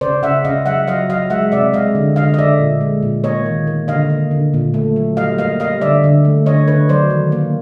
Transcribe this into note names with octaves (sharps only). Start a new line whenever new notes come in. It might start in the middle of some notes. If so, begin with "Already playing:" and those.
C#3 C5 D5
C#3 E5 F#5
C#3 D#5 F5
F#3 E5 F#5
F#3 D#5 F5
F#3 D#5 F5
G#3 E5 F#5
C3 D5 E5
G#3 D#5 F5
D3
D3 D#5 F5
D#5
D3 D5 E5
A#2
G#3
A#2
A#3 C#5 D#5
D#3
A#3
D3 D#5 F5
A#3
D3
A#2
A3
F#3
G3 D#5 F5
A#3 D#5 F5
G3 D#5 F5
D3 D5 E5
D3
A3
D3 C#5 D#5
D3 B4 C#5
F#3 C5 D5
D#3
A#3